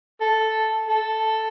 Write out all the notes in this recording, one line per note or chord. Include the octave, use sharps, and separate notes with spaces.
A4
A4